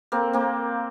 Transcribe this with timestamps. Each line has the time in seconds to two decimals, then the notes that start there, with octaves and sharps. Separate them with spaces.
0.12 A#3 C4
0.33 A#3 C4